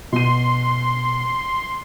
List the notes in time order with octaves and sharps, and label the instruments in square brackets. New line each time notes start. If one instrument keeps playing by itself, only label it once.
[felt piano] B2 D#7 [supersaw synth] C6